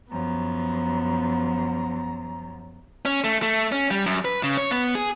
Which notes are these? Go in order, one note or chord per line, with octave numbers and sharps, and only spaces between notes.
F#2 F3 B3 A#5
C#4
A3
A3
C#4
G3
F#2
B4
C#3
C#5
B3
G#4